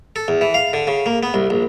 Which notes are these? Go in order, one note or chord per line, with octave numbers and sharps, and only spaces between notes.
A4
E2
E3
F5
D3
C#3
A#3
B3
C2
A#1